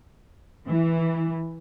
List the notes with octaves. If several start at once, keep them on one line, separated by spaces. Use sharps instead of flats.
E3